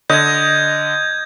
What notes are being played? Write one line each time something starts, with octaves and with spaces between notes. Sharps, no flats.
D3 D#5 G6 G#6